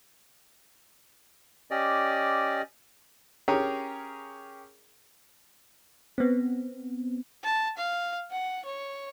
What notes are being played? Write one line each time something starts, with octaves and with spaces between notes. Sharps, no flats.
C#4 G4 D5 D#5
C#4 G4 G#4 A#4 C#5
B3 C4
A5
F5
F#5
C#5